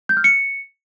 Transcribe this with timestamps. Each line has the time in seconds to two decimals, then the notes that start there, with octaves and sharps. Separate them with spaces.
0.09 G6
0.17 F6
0.24 C#7